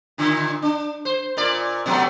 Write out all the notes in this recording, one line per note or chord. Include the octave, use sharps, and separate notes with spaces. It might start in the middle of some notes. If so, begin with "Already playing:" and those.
A#2 D3
D4
C5
A#2 A#4 D5
B2 F#3 A3